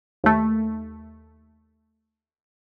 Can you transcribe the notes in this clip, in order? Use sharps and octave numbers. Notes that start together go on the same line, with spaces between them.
D#2 A3